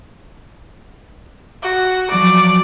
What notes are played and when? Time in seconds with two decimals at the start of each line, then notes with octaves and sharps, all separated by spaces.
1.63 F#4
2.11 F3 F#3 D5